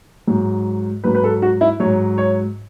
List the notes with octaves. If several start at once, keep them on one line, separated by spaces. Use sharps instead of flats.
G#2 F#3
G#2 F#3 B4
B4
A4
F#4
E4
G#2 F#3 C#5
C#5